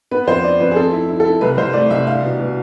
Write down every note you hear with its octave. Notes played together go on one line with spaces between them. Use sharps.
B3 B4
F2 C5
D4 D5
F2 B4
G#4
C4 A4
E4
E4
A4
E4
C2 B4
C2 C5
A3 D5
C2 E5
D4 F5
B2
B2